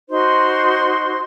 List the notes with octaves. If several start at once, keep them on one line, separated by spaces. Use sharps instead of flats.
D#4 F#4 C5 C6